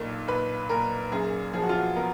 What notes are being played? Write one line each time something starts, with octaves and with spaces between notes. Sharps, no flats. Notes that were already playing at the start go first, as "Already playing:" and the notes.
Already playing: B1 A#2
A#2 B4
A#2 A#4
F#2 G#4
F3 G#4
F#4
F4
F#4
B3 A#4